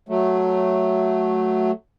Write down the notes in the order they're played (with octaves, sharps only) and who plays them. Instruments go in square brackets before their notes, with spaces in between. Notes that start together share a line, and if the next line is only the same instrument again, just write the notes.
[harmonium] F#3 A3